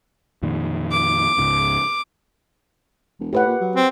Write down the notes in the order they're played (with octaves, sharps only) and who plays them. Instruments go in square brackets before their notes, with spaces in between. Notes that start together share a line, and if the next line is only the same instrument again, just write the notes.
[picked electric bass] F2 A#2 D#3
[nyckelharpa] D6
[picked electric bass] C#2 G#2 C#3
[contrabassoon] E1
[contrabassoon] A2 [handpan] G4 B4 F#5
[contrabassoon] A#2
F#3
[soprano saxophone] C4